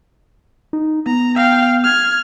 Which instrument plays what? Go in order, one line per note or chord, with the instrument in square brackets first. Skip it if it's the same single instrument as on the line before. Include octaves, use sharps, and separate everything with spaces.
[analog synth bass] D#4
[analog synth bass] B3 [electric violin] A#5
[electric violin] F5 G5
F6 G#6